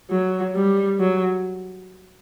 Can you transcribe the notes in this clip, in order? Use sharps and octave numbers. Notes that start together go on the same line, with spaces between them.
F#3
G3
F#3